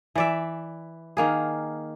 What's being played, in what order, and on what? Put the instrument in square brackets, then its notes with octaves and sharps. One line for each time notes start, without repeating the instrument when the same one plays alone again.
[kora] E3 D5 E5
D#3 A#3 G#4